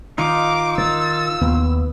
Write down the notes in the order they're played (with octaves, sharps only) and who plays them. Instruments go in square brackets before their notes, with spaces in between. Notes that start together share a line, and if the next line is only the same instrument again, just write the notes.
[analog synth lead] D#3 [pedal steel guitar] D#4 F4 [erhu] D6
[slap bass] D#3 [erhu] E6 [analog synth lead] A6
[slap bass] D#2 [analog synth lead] B3